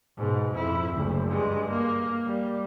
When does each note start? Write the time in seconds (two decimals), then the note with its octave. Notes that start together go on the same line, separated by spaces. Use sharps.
0.18 G#2 B2
0.56 F2 E4
0.93 F#1 D2
1.29 G2 G#3
1.70 A#3
2.27 G3